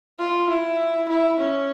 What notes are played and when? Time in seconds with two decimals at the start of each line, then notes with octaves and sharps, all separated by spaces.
0.19 F4
0.49 E4
1.09 E4
1.39 C#4